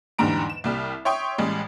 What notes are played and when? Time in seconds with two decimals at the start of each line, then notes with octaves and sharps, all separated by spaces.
0.19 E2 G#2 D3 G3 A#5 D7
0.50 E7
0.64 C2 G3 F6
1.05 C#5 E5 G5 C6 C#6 D#6
1.38 A1 G3 G#3